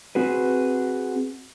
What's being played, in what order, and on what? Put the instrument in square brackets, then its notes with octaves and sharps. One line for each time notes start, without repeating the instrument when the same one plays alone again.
[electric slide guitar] C4 F#4 G#4 B4